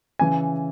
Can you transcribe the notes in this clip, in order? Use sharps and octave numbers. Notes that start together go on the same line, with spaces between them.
C#3 E3 G#5